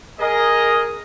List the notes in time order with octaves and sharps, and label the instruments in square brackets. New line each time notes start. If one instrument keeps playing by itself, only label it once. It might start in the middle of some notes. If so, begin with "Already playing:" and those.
[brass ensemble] G#4 A#4 D#5